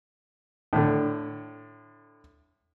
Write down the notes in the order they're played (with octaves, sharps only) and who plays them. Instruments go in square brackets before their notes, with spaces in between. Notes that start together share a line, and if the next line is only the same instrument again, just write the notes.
[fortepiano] A2 D3